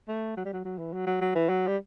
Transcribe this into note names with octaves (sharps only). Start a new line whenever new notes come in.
A3
F#3
G3
F#3
F#3
E3
F#3
F#3
F#3
E3
F#3
G3